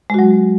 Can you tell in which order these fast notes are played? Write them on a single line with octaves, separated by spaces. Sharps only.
G#3 F#4 F#3